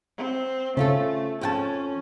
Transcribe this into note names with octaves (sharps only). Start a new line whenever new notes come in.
C4
C#3 A3 C#4 F4 A4
F2 C#4 G5 A5